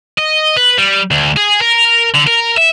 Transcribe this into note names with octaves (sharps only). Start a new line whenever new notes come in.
D#5
B4
G3
D2
G#4
A#4
D3
A#4
E5